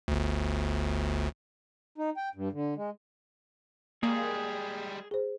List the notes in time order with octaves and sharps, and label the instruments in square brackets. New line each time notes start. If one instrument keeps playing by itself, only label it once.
[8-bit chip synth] G1 D2
[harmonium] D#4
G5
G2
D3
G#3
[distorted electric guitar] G3 G#3 [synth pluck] A#3 [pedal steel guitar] G#4
[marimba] G#4 C5